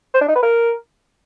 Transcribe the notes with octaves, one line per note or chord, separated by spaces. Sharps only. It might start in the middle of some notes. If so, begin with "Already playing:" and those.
C5
D4
D#4
B4
A#4